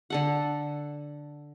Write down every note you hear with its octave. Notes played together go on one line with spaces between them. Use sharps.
D3 A4 F#5